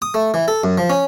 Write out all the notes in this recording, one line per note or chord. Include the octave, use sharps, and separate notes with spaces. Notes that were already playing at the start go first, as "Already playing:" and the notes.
D#6
A3
E3
A4
F#2
F3
C#4